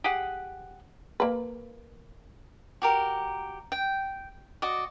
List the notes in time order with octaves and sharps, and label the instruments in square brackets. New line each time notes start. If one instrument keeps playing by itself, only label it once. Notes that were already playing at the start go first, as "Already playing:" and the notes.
[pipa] G4 G#4 F#5
[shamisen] A#3 B4
[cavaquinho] F#4 G4 A#4
G5
F#4 D5 D#5